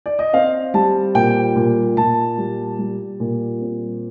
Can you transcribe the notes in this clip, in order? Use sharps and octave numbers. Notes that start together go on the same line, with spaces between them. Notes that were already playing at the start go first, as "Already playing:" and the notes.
D5
D#5
C4 F5
G3 A5
A#2 G5
A#2
A#2 A5
G3
G3
A#2
C4